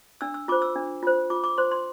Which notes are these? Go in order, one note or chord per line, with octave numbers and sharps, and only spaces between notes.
D4 E6
E6
F4 C5 D6
E6
D4
F4 C5
F4 D6
D6
C5 C6
C6